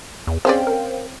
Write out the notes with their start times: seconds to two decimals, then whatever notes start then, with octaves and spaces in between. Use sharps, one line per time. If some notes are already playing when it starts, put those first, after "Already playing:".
0.27 E2
0.45 C4 C#4 G#4 C5 D5 F5 G5
0.67 A#4